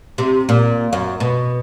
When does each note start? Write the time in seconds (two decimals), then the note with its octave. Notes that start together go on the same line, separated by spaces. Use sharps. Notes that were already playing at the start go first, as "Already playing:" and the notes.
0.18 C3
0.49 A#2
0.93 F#2
1.20 B2